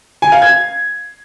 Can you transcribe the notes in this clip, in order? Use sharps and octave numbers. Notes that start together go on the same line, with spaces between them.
G#5
F5
G#6